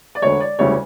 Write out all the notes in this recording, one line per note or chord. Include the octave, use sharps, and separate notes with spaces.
D5
E1 D2 D3 C#5
D5
E1 D2 C#3 E3 G3 C#5